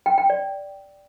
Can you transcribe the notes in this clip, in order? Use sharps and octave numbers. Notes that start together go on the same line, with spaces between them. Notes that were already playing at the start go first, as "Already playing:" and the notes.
G5
G5
D5